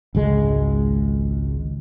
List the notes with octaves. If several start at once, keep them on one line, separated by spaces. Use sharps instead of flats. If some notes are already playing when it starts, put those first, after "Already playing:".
G#1 C#2 G#3